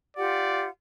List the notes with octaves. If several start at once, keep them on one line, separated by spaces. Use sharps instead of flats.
F4 G4 D5 F#5